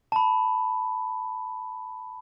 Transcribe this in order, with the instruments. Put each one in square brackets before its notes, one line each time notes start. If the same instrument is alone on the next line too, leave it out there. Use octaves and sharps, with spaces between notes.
[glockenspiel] A5 B5